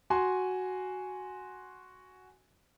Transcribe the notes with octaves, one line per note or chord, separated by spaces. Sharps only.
F#4 G#5 C6